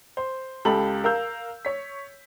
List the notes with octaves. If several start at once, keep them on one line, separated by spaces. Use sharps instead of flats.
C5
C#2 G4 A4 B5 F#7
A#4 F5 E6 G6
C#5 B6